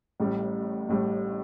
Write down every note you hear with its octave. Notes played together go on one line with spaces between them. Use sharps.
A1 A2 G3
A1 A2 G3